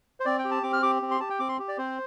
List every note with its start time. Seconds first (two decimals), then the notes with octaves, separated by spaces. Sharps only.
0.20 C5
0.25 C4 D5
0.39 G5
0.44 G4
0.51 A5
0.63 C4 D6
0.73 F6
0.82 G4 D6
1.02 C4
1.11 C6
1.20 G4 A5
1.30 G5
1.40 C4 D6
1.49 C6
1.59 G4
1.68 D5
1.78 C4 C5